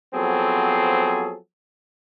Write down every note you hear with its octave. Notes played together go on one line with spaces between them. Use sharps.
F3 F#3 B3 C4 G#4 A4